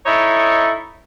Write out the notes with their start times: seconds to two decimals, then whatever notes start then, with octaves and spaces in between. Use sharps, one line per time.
0.06 D#4 E4 A4 C#5 D#5